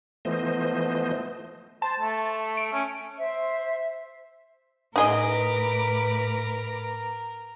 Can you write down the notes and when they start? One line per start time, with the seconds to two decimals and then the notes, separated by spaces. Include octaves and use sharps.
0.25 E3 F3 A3 B3 C5 D#5
1.82 C5 A5
2.00 A3
2.57 D7
2.73 C#4
3.18 C5 E5
4.96 A2 D#4 G#4 A#4 B4 D#5 D6